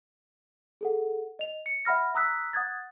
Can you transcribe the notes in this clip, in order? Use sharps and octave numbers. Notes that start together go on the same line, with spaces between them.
G#4 A4 F#5
D#5 F7
C#7
E5 F#5 B5 F6 A#6
A#5 D#6 E6 F#6 B6
F#5 D#6 F#6 G#6 A6